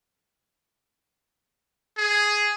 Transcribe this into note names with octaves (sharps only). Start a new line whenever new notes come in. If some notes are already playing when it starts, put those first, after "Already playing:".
G#4